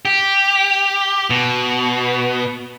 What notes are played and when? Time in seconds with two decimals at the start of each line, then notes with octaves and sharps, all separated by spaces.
0.05 G4
1.30 B2